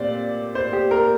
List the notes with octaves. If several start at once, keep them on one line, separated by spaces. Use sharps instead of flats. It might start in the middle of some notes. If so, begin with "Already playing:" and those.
Already playing: A#2 C4 G4 C5 D5
C5
G4
A#4